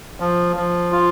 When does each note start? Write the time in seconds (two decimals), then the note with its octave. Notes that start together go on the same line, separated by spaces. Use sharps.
0.20 F3
0.56 F3
0.92 F4